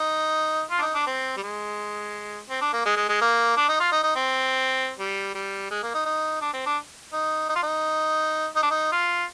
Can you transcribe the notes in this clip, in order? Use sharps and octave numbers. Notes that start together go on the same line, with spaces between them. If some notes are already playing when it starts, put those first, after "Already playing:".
Already playing: D#4
F4
D4
D#4
D4
C4
G3
G#3
C4
D4
A#3
G#3
G#3
G#3
A#3
D4
D#4
F4
D#4
D#4
C4
G3
G3
G#3
A#3
D#4
D#4
D4
C4
D4
D#4
D#4
F4
D#4
D#4
D4
D#4
F4